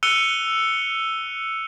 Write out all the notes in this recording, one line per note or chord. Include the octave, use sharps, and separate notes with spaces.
E6 F#6 C#7 D#7 F7 G7